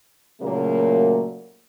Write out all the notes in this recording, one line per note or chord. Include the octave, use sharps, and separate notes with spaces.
A#2 C#3 F#3 A3 A#3